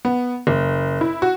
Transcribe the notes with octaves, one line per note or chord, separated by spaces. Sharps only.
B3
F#1
E4
F#4